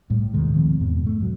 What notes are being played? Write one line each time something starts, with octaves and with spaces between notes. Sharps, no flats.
A2 G3
D#2 B2 D#3 G#3
D#3 F3 C4
E2 G#2 B2
A3
G#2 F#3